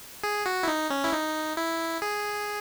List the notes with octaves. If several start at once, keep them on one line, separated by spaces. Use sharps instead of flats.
G#4
F#4
E4
D#4
C#4
E4
D#4
E4
G#4